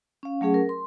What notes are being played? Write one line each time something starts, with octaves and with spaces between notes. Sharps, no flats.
C#4 F5
F#3 A3 C#4 G#4 F#5
A#4
C6